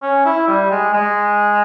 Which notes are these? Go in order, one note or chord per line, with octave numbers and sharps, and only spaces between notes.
C#4
E4
G3
G#3
G#3